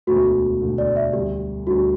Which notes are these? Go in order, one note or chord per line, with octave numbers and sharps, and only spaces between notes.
E1 D2 D3 A3 F#4
E1 D2 D3 A3
D5
E5
D2 D3 G3 G4
D2 D3 G3 F#4